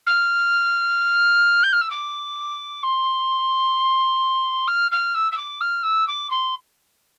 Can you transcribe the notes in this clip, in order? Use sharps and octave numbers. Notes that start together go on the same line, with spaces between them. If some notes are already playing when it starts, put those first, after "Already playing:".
F6
G6
F6
E6
D6
C6
F6
F6
E6
E6
D6
F6
E6
D6
C6